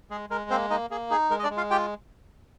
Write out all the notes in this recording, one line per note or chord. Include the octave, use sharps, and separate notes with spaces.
G#3 G#4
G#3 A#4
A#3 C4 C5
A#3 D#4 D#5
A#3 G#4
D#4 G#4
G#3 A#4
D#5
D4 D5
G#3
F4 F5
F4 G4 G5